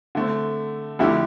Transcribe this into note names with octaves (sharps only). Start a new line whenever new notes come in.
D3 A3 C4
F2 D3 A3 E4 G4